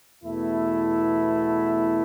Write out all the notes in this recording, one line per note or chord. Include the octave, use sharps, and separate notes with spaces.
E2 B2 A3 E4